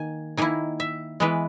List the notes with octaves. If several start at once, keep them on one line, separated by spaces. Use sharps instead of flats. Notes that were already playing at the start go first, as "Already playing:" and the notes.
Already playing: D#3 A#3 G#5
D#3 A#3 E4 G#5
E5
E3 G#3 B3 B4